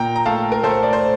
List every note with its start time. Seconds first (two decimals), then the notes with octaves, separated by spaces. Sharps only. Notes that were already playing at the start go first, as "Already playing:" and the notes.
Already playing: A#2 G5 A#5
0.16 A#5
0.26 A3 F5 A5
0.52 A#4
0.63 A3 A4 C5
0.83 D5
0.93 C5